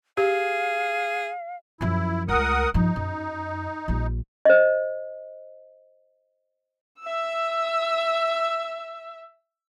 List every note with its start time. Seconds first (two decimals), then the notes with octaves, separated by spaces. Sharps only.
0.17 G4 G#4 F5
1.81 F#2 F3 E4
2.28 C#2 A3 A#4 F#5 D#6
2.74 G2 F3 D#4
2.96 F#2
3.88 A#1 G3
4.45 C5 D#5
7.00 E5 E6